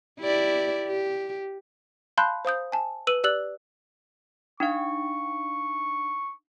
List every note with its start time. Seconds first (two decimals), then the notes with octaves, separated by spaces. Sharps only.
0.20 E4 G4 D5
0.87 G4
2.18 F5 A5 B5 C6 F#6 G6
2.45 C5 F5 D#6 G6
2.72 G#5 A5
3.07 B4 E6 D#7 F#7
3.24 G4 D5 E6 F#6 F#7
4.60 D4 D#4 F5 C#6